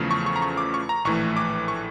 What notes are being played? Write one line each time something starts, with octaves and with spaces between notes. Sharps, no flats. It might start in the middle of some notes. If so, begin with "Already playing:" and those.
Already playing: E2 C#3 F3 A3
C#6
C#6
A#5
C#6
D6
C#6
A#5
A#1 A2 E3 A3 C#6
D6
C#6